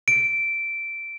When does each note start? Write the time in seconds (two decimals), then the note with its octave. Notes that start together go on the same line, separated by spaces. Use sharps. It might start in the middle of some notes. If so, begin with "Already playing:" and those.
0.08 D7